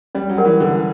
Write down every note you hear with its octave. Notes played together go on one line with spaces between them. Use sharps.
G3 C#4
F#3
G4 A#4 D5 F#5
E3
D3 C#4